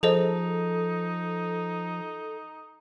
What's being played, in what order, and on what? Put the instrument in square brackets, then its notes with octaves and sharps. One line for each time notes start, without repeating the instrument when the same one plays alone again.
[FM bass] F3 [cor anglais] D#4 [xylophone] G#4 C5 D#5 [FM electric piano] A4